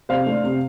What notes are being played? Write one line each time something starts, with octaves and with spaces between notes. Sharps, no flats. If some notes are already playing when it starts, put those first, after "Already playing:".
C3 C5 F5
A3 D4
C3